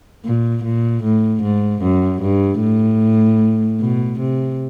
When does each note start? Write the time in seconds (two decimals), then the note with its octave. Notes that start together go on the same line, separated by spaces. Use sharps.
0.24 A#2
0.64 A#2
1.03 A2
1.43 G#2
1.82 F#2
2.22 G2
2.61 A2
3.80 B2
4.19 C3